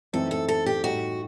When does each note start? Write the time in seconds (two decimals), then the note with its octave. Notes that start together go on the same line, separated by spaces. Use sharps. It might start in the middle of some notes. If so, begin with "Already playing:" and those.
0.13 F#2 E3 A3 C4 D#4 A4
0.31 A4
0.48 A4
0.66 G4
0.84 A2 G3 D#4 F#4